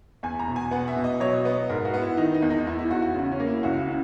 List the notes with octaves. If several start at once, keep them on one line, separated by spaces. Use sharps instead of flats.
E2 G#5
A#5
B2
G#5
B3 F#5
E5
B2
D#5
F#3 C#5
D#5
B3 D#5
G#2 A#4
F#4
B3
E4
D#3 D#4
D#4
E2
D#4
E2 E4
E4
E2 F#4
F#4
C#3
C#4
A#3
E4
C#2 F#4
E4
C#3